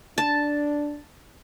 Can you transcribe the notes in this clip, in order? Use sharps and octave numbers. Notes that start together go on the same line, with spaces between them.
D4 A5